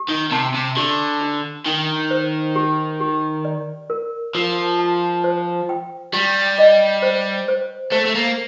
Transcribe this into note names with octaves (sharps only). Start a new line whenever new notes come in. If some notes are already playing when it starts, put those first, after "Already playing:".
Already playing: G4
D#3
C3 A5
C3
D3 G4
D4
D#3 G5
C5
G4
G4
D5
A#4
F3 A#4
A5
C5
G5
G3 G4
D#5
C5
C5
A3 C5
A3
A#3